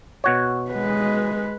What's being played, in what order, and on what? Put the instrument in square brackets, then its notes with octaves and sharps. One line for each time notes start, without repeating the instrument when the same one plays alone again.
[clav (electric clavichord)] B2 F#4 C#5
[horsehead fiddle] G#3 B4